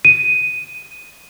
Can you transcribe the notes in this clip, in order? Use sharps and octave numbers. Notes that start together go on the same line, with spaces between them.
D#7